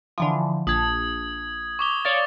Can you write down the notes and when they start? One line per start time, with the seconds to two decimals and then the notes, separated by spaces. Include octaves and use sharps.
0.18 D3 E3 F3
0.67 A#1 A5 D#6 G#6
1.79 C#6 D6 G7
2.05 C#5 D5 F5 A6 G7